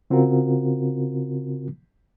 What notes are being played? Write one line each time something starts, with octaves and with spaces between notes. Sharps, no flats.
C#3 C4 F4 F#4 A#4